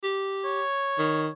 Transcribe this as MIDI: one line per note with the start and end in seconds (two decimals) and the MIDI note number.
0.03 0.62 67
0.45 1.33 73
0.98 1.28 51